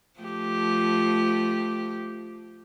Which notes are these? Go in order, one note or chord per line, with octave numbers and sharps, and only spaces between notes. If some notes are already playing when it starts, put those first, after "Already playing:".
F3 A3 G4